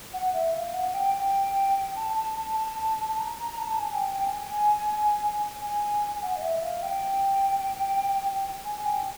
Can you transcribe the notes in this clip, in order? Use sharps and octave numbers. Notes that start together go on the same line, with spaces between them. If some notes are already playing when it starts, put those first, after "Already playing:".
F#5
E5
F5
F#5
G5
G5
A5
A5
A5
A5
A#5
A#5
A5
G#5
G5
G5
G#5
G#5
F#5
D#5
E5
F5
G5
G#5
G5